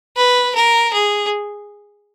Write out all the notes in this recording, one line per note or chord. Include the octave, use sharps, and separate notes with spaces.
B4
A#4
G#4